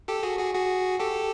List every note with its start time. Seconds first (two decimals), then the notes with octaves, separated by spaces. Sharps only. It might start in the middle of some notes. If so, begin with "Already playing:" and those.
0.08 G4 A4
0.23 F#4 G#4
0.39 F#4 G#4
0.54 F#4 G#4
1.00 G4 A4